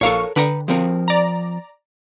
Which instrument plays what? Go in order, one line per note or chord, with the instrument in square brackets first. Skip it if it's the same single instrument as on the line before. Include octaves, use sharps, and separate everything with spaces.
[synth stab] A#1 F5 C#6 [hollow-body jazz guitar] A4 A#4 C#5
[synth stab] D3 [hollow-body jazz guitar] B4 G5 A#5
[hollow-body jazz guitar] F3 C4 A#4
[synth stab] D5 A#5